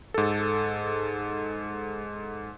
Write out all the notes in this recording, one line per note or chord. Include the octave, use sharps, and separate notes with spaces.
G#2 A4